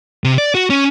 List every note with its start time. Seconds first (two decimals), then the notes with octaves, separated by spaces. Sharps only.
0.24 C3
0.38 D5
0.55 F#4
0.70 C#4